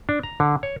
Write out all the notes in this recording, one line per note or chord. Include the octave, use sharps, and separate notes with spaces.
D4
A#5
D3
C#5